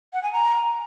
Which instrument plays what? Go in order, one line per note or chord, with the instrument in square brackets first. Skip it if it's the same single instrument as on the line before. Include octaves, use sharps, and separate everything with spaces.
[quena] F#5
G#5
A#5